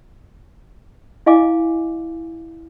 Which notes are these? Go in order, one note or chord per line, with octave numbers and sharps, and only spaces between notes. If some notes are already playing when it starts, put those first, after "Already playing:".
E4 D#5 F5 G#5 D6